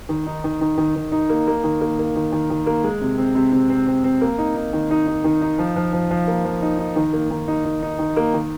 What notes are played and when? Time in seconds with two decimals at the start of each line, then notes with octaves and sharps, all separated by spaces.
0.09 D#3
0.26 D#4
0.44 D#3
0.61 D#3
0.78 D#3
0.95 D#3
1.12 D#4
1.29 A#3
1.47 A#3
1.64 D#3
1.81 A#3
1.99 A#3
2.16 D#3
2.32 D#3
2.50 D#3
2.66 A#3
2.84 G#3
3.01 C3
3.18 C4
3.35 C3
3.52 C3
3.70 C4
3.87 C4
4.04 C4
4.21 A#3
4.38 D#4
4.56 D#4
4.73 D#3
4.91 D#4
5.07 D#4
5.24 D#3
5.41 D#4
5.58 F3
5.76 F3
5.93 F3
6.11 F3
6.27 A#3
6.45 F3
6.62 D#4
6.79 D#4
6.96 D#3
7.13 A#3
7.31 D#3
7.48 D#4
7.65 D#4
7.82 D#4
7.99 D#3
8.16 A#3
8.34 D#3